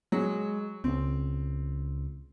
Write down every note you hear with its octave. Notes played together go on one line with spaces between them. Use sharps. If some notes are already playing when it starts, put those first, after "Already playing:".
F#3 G#3
C#2 C4